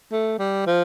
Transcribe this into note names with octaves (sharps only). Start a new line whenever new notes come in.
A3
G3
F3